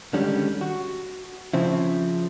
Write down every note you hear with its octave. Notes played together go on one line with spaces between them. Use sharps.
D3 D#3 G3 G#3 C#4 D4
F#4
C#3 F3 C4 E4